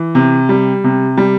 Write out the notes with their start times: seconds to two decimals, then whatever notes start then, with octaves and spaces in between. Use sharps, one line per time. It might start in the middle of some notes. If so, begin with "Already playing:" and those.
Already playing: E3
0.15 C3
0.49 G3
0.84 C3
1.17 G3